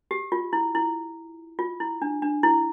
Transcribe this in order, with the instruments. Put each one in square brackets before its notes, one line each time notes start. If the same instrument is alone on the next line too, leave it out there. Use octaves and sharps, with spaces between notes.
[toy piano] G4
F4
E4
E4
F4
E4
D4
D4
E4